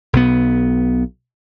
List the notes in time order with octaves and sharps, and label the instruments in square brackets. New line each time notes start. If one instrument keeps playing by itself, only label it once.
[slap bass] B1 B3